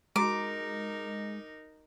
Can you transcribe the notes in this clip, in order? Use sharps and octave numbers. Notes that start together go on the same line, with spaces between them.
G#3 D#4 F#4 A#4 A#5 D6